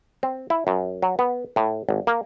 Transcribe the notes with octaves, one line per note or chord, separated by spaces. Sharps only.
C4
E4
F#2
F#3
B3
A2
G#1
A#3